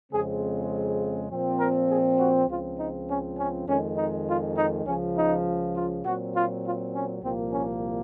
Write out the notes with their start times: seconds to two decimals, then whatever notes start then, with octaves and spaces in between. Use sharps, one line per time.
0.10 F2 C#3 G#3 C4 G#4
1.30 A#2 F3 C4
1.59 A#4
1.89 G#4
2.19 F#4
2.49 C#2 C#3 F3 C4 F4
2.78 D#4
3.08 C#4
3.37 C#4
3.67 F2 D#3 G#3 C#4
3.97 D#4
4.27 F4
4.56 D#4
4.85 C#2 C#3 F3 C#4
5.16 D#4
5.75 F4
6.04 A#2 F#3 C4 F#4
6.34 F4
6.63 F4
6.93 C#4
7.22 C2 A#2 F3 A#3 C4
7.52 C#4